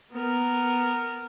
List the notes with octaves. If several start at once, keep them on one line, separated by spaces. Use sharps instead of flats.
B3 A#4